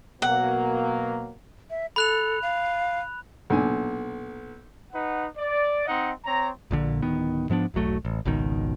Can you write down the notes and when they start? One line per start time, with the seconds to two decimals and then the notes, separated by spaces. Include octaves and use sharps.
0.22 B2 F#3 A#3 F#5
1.70 E5
1.96 A4 B5 F#6 F7
2.42 F5
3.50 B1 A#2 D4 G#5
4.93 D#4 B4 F#5
5.37 D5
5.86 C4 D#4 D#5 F#5
6.24 C4 C#5 A#5
6.71 A#1 A#2 D3
7.02 D1 D#3 B3
7.50 G#2 F3 B3 D4
7.74 E1 B1 F#3 A3
8.05 A1
8.25 G#1 C#2 B2 D#3